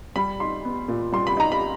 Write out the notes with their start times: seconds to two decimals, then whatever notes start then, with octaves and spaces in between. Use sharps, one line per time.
0.16 G3 B5
0.40 D#4 C6
0.65 B3
0.88 A#2
1.12 G3 C6
1.27 B5
1.37 D#4 A#5
1.52 B5